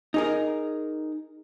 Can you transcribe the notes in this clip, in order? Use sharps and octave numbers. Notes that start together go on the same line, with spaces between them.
D#4 G#4 A#4